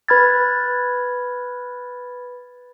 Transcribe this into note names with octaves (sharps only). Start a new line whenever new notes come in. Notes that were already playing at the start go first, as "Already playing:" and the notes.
B4 B5 F6 G#6 A6